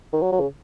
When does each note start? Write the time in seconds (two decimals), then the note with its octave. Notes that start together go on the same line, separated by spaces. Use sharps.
0.13 D#3
0.22 F#3
0.32 F#3
0.40 C#3